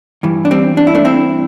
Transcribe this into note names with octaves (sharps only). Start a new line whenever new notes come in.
G2 E3
D4
G3 C4
D4
E4
A3 D4
C4 E4